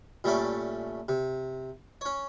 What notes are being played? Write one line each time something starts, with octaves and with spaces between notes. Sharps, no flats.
A#2 G3 A3 C#4 D6
C3
C#4 C#5